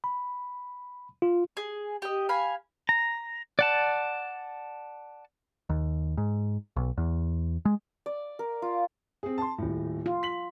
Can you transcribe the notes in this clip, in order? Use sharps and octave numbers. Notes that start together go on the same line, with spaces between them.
B5
F4
G#4
G4 D#5
F5 G#5 B5
A#5
D5 F#5 A5
D#2
G#2
B1
E2
G#3
D5
A#4
F4
C4 G#4
A5 C6
D#1 A2
F4
B6 F#7